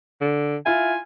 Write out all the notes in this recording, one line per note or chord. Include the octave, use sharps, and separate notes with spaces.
D3
E4 F4 G#5